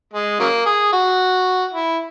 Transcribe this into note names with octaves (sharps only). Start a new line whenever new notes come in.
G#3
C#3 F#3 A#3
G#4
F#4
E4